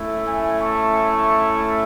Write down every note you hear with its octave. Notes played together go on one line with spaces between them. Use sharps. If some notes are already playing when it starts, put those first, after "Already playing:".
Already playing: A3 C#4 E4
E5 G#5
A5 C#6